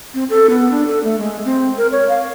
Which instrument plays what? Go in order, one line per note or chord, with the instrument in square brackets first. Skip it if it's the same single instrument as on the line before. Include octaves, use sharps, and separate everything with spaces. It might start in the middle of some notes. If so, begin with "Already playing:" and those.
[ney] C4
A4
B3
D4
A4
A3
G#3
C4
A#4
C#5
F5